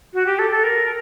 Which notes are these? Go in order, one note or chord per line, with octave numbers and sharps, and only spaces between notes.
F#4
G4
A4
A4
A#4